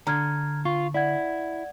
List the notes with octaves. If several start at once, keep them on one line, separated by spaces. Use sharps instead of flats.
D3 A#5 F6 G#6
F4 C#6
E4 D5 F#5 G#6